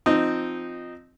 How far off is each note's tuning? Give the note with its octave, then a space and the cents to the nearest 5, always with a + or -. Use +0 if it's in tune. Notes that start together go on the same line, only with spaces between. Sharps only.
F3 +5 C4 -10 D#4 -10